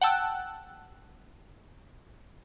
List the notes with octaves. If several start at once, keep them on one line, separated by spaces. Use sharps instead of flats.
F#5 G5 A5 E6 F#6